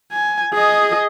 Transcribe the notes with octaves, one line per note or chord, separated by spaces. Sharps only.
G#5
G#4 D#5